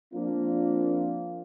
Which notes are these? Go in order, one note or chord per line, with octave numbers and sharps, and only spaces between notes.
F3 A#3 C4 D4 F4